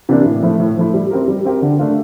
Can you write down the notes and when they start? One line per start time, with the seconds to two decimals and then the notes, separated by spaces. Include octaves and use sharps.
0.09 C3 E3 A#3 D4
0.26 A2
0.43 F3 A3 E4
0.60 A2
0.77 F3 A3 E4
0.94 G3
1.11 C4 G4 A#4
1.28 G3
1.45 C4 G4 A#4
1.62 D3
1.79 A3 D4 F4